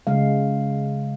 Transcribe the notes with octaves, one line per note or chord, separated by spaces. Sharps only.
C#3 G#3 F5